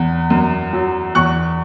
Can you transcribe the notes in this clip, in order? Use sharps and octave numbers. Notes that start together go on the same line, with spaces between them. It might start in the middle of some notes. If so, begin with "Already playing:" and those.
Already playing: E2 B3
F#2
F#3
E2 C#6 F#6